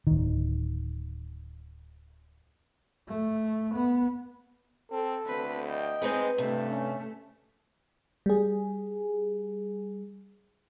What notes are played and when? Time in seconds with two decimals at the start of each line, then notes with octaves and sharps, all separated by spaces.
0.07 D1 D#3
3.08 A3
3.74 B3
4.92 C4 A4
5.26 D2 C4 B4
5.69 D#5 G5
6.02 G#3 C4 D#4 B4
6.38 G2 C3 A3
6.71 C#4
8.26 G3 G#4